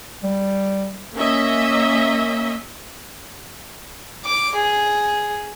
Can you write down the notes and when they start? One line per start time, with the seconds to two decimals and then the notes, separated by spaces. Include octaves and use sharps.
0.24 G3
1.15 A#3 C#4 D#5 E5
4.25 D6
4.55 G#4